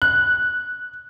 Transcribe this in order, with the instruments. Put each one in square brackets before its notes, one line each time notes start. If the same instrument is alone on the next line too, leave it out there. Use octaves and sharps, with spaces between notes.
[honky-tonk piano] F#6